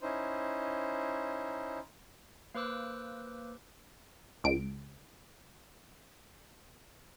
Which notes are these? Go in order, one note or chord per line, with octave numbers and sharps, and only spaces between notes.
C#4 D#4 E4 C5
A#3 B4 C5 D6 E6 F#6
C#2 D7